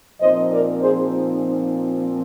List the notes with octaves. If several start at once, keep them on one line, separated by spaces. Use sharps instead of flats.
A#2 F3 C4 D#4 C5 D#5
A#4 D5
G#4 C5